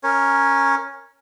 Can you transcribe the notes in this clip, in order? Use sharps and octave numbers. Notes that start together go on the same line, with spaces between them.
C#4 A#4 C#5